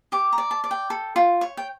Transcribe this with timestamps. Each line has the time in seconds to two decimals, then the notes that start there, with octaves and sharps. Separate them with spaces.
0.12 G4 D6
0.33 A#5
0.38 D5
0.51 A5
0.64 D5
0.71 G5
0.90 A4
1.16 F4
1.41 C#5
1.57 G5